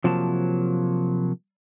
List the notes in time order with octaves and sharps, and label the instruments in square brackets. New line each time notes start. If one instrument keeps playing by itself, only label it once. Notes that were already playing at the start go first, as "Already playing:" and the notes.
[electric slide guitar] C3 F3 F#3 A#3 A5